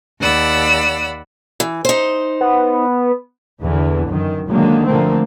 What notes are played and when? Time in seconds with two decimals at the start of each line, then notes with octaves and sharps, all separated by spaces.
0.21 D#2 D5 F#5 B5 E6
1.60 E3
1.85 D#4 C5
2.41 B3
3.62 E2 D3 E3
4.09 F#2 D#3
4.48 D3 D#3 F#3 G#3 A#3
4.86 D3 F3 A3 A#3 C4